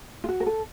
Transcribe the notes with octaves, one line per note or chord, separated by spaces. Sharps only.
F4
F#4
A#4
A4